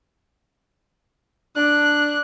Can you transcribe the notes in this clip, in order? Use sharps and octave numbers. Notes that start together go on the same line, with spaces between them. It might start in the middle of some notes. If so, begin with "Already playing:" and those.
D4 F#6